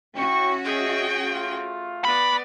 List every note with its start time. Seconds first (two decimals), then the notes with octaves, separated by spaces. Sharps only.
0.16 C#4 E4 F#4 G5 C#6
0.64 G#4 D#5 E5 G5
1.26 A3 F4
2.05 B3 D5 B5